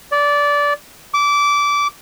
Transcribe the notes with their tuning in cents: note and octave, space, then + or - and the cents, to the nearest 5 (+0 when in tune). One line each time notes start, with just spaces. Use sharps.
D5 -20
D6 -20